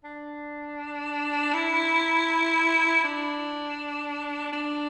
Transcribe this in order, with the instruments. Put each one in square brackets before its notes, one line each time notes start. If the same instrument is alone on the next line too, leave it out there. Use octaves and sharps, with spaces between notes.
[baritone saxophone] D4
E4
D4
D4